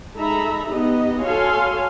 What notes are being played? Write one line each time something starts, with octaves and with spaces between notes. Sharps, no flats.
G#3 D#4 A4 E5 A#5 B5
B3 D#4 G4 D#5
F#4 A4 C#5 F5 G#5 C6